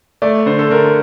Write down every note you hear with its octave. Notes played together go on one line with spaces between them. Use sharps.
A3 D5
D3 C5
A4
D3 A#4